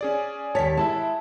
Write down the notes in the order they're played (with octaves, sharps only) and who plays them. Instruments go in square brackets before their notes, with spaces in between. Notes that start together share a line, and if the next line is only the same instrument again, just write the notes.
[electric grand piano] C#4 G#4 D5
[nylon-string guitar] D#2 C#5 [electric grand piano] A5 B6
[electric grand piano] G#3 E4 E5 [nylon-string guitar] A5